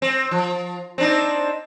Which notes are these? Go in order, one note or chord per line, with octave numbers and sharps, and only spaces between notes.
C4
F3
C4 D4 D#4